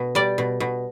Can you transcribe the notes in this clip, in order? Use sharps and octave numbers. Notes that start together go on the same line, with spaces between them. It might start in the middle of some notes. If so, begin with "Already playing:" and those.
Already playing: B2
G3 D5
B2
B2